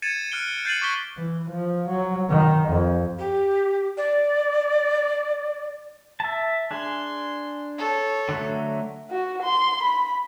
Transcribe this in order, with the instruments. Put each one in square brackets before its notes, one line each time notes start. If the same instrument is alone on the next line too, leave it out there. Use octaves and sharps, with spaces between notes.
[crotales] G#6 A6 C#7 D#7 E7
F6 F#6 C#7 D7 G7
G6 A6 C7 C#7 D#7 F#7
C#6 D6 B6 G7
[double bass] E3
F3
F#3
D#3
F2
[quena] G4
D5
[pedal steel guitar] E5 A5
[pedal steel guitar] D4 G#4 [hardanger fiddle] C6
[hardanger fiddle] A4 C#5
[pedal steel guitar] D3 F#3 A3
[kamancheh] F#4
C6
B5